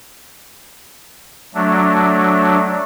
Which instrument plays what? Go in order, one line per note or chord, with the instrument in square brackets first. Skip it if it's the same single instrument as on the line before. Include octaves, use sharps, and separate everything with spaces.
[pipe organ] F#3 A3 D4